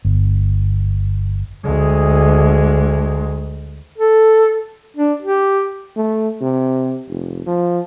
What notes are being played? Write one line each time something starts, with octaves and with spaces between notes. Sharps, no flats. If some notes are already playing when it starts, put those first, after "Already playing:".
G1
D2 G#3
A4
D4
G4
A3
C3
F1
F3